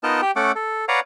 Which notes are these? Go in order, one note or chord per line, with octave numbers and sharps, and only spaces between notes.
B3 D#4 F4 A#4 D#5 A5
G4 G5
A3 C#4 A4 F#5 D6
A4
B4 C#5 D5 F5 F#5 A#5